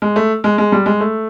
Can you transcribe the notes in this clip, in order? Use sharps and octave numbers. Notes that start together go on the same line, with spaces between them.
G#3
A3
G#3
G#3
G3
G#3
A3